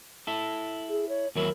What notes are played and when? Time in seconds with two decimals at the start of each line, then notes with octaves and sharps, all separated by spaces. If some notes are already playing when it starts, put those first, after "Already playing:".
0.27 E4 A4
0.90 G#4
1.09 C#5
1.36 D#2 F#3 E4 A#4